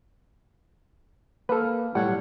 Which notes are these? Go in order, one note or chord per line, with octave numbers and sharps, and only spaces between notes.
A#3 A4 B4
B1 A2 G3 C#5 F#5